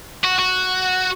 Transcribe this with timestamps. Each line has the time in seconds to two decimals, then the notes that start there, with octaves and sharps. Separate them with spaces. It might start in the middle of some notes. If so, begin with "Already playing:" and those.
0.24 F#4
0.39 F#4